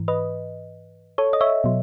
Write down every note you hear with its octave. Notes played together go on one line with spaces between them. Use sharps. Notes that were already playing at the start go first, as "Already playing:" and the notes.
Already playing: G#2 E3
B4 D#5
A4 C#5
D#5
C#5 E5
B2 F#3